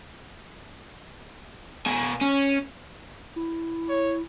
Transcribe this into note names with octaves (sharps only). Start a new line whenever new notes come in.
B2 G#5
C#4
E4
C#5